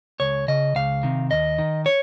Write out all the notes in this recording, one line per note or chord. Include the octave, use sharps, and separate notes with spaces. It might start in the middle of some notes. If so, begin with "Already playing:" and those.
C#2 C#5
C#3 D#5
C#2 F5
C3 D#3
D#2 D#5
D#3
C#5